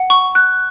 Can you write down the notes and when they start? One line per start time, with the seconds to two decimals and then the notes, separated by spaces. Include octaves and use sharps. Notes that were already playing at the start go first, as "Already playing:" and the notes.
Already playing: F#5
0.10 C#6
0.35 F#6